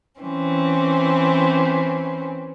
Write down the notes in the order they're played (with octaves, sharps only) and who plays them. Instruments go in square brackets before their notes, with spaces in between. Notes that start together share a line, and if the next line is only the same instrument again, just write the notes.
[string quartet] E3 C4 C#4